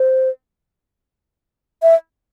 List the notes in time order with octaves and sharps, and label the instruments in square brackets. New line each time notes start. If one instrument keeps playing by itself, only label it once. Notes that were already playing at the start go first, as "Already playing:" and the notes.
Already playing: [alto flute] C5
E5